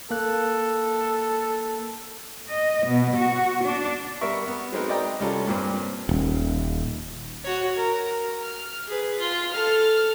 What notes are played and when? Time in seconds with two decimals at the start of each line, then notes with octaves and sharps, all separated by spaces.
0.11 A#3 A4 F#6
2.48 D#5
2.86 B2
3.16 F#4
3.64 D4
4.21 G3 B3 A#4 E5 C#6
4.48 B3
4.72 F#3 G#3 C4 D#4 A#4 B4
4.89 D5 D#5 G5 A#5 D#6
5.20 C2 G3 C#4 F4 A4
5.47 G2 A#2 A#3 C4
6.09 D#1
7.44 F#4 C#5
7.77 A#4
8.41 F6
8.87 G#4 B4
9.19 F4 C6
9.52 A4 F6